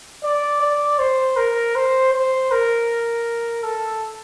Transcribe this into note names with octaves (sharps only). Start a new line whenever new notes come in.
D5
D5
C5
A#4
C5
C5
A#4
A4